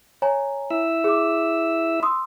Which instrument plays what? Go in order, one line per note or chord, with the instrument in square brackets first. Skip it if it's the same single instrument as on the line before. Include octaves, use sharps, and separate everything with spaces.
[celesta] C#5 G#5 A#5
[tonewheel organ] E4 E5 E6
[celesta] G#4 D6
C6 D#6 E6